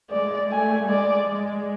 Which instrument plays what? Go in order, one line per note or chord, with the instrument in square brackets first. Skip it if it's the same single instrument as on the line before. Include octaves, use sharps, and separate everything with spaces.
[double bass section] G#3 [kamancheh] D5
[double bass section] A3 [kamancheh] G#5
[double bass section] G#3 [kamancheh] D5
[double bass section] G#3